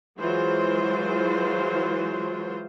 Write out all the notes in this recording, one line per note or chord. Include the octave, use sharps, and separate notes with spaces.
E3 F#3 G#3 F4 C5